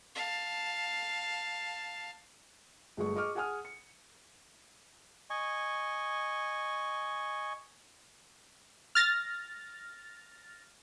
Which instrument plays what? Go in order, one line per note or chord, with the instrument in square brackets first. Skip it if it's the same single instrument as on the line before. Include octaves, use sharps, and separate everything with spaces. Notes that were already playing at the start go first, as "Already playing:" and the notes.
[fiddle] F5 A5
[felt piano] G1 G#3 A3 G#4 C#6
G#4 D#5 C#6 D6 F6
G#4 F#5 G#5 D#6 F6
C#7
[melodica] D#5 G#5 C#6
[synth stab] F6 A6 A#6